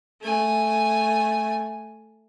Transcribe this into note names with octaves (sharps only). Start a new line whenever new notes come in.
A3 G#5